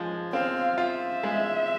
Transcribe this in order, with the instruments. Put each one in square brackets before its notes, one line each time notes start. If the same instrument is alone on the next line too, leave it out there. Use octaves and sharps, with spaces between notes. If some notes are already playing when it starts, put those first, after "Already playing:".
Already playing: [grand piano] F3 G#3
[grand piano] C4 [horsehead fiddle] F5
[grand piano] F4 [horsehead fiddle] E5
[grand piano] G#3